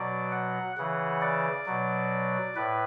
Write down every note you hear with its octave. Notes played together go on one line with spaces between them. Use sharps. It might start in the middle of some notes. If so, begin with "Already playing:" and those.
Already playing: B2 F#3 D5
F#5
C#3 E3 F#5
D5
B2 F#3
A2 B4